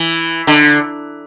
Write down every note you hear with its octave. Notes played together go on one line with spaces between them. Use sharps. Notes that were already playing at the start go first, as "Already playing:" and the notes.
Already playing: E3
D3